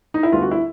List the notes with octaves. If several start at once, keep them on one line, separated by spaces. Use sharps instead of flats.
D#4
E4
D2 D3 G3 B3 D4 F4
F#4
E4